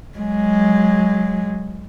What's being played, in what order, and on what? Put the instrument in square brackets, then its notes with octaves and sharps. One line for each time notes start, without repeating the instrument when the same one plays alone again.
[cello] F#3 G#3